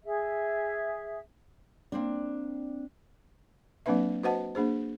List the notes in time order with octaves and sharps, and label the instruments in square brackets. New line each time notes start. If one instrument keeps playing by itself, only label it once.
[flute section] G#4 E5
[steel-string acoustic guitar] A#3 C4 D4
[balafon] F#3 A#3 C4 D4 B4 E5
F#4 B4 C5 D#5 F#5 A5
A#3 D4 G#4 C5